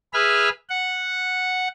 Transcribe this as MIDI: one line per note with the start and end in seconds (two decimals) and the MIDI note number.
0.14 0.49 68
0.14 0.49 71
0.14 0.49 76
0.14 0.49 83
0.14 0.49 89
0.69 1.68 78